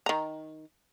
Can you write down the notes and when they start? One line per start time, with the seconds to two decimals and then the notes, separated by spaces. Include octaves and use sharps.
0.06 D#3 A#5